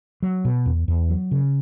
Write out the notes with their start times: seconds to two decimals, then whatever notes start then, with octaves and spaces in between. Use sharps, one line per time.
0.23 F#3
0.45 B2
0.66 E2
0.88 E2
1.10 F#3
1.31 C#3